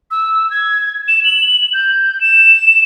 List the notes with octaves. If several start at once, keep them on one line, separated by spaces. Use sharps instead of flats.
E6
G#6
E7
F#7
G6
E7